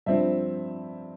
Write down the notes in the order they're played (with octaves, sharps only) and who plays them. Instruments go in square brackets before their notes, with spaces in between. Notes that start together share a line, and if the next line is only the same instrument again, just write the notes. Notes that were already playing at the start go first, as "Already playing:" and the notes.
[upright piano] G2 F3 C4 E5